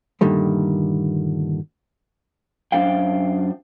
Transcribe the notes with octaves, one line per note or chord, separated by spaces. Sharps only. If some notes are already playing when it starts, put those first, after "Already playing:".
G2 A#2 D3 D#3 G3 A3
F#2 D4 C5 F5 G5